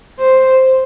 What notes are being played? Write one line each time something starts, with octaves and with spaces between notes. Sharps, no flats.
C5